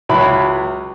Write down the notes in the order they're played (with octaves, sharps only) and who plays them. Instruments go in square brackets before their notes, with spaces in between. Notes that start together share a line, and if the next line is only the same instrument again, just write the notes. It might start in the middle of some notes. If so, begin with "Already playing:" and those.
[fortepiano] C#2 F#3 E4 B5